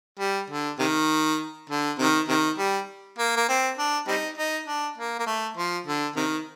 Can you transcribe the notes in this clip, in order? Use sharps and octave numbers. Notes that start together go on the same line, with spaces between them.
G3
D3
C3 D#3
D3
C3 D#3
C3 D#3
G3
A#3
A#3
C4
D4
G3 C4 D#4
D#4
D4
A#3
A#3
A3
F3
D3
C3 D#3